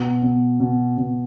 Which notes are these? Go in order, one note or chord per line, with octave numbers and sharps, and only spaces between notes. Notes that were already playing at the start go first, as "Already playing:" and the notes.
Already playing: B2
B2
B2
B2